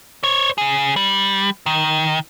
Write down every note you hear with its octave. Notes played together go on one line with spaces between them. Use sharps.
C5 C#5
C#3 G#4
G3
D#3